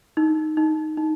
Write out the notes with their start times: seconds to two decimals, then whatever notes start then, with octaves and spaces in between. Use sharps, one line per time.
0.17 D#4
0.57 D#4
0.97 D#4